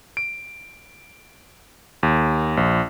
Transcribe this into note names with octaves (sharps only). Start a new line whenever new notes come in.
D7
D#2
A#1